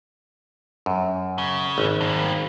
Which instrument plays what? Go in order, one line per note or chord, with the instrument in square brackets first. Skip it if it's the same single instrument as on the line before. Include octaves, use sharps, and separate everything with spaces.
[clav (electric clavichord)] F#2
[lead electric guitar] C#3
[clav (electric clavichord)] G#1
[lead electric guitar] G2 A#3